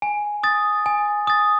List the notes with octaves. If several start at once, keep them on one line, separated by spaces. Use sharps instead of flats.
G#5
D#6 A6
G#5
D#6 A6